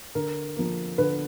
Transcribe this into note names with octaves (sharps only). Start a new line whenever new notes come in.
D3 A#4
F3 A#3
D3 B4